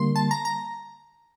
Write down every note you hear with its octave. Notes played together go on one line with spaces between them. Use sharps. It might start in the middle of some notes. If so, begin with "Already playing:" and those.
Already playing: D3 G3 A#3 C6
A5
A#5
A#5